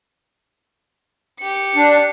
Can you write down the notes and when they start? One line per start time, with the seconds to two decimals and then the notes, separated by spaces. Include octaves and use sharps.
1.40 G4 C#7
1.76 D4